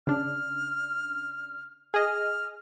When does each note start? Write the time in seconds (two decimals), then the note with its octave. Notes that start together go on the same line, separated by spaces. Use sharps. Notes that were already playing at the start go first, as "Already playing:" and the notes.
0.07 C#3 D4 F6
1.94 G#4 D#5 F6